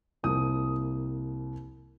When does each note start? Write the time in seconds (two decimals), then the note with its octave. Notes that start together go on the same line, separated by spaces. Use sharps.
0.23 C2 C3 F3 A#3 D#6